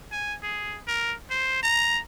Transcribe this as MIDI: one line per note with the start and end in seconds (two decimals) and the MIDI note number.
0.12 0.35 80
0.43 0.79 68
0.87 1.14 70
1.31 1.62 72
1.63 1.99 82